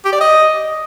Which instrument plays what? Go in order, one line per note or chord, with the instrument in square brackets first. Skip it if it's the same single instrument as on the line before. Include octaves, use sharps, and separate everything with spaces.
[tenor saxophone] G4
D5
D#5